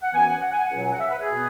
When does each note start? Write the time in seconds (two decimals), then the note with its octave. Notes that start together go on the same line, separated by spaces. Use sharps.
0.02 F#5
0.13 F#2 E3 B3 G#5
0.27 F#5
0.41 F#5
0.53 G#5
0.62 F#5
0.70 C#2 B2 F#3
0.83 G#5
0.92 F#5
1.00 E5
1.09 B4
1.20 G#4
1.29 B2 B3